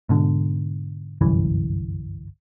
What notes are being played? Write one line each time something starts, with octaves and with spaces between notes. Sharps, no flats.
G#2 B2 D3
G1 C2 F#2 E3